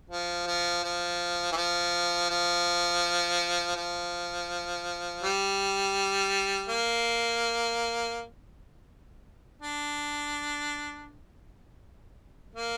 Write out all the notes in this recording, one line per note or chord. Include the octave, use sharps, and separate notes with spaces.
F3
F3
F3
E3
F3
F3
F3
G3
A#3
D4
A#3